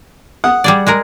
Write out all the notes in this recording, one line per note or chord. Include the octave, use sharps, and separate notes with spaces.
F#5 D#6
G3 G#4 D5
G#3 G#4 A#4